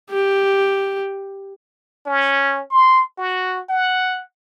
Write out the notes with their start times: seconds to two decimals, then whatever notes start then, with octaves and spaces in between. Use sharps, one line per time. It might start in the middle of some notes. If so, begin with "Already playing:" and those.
0.10 G4
2.06 C#4
2.71 C6
3.18 F#4
3.69 F#5